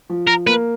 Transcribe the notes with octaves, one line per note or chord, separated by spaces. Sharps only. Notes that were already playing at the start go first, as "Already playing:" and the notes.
F3
A#4
A#3 B4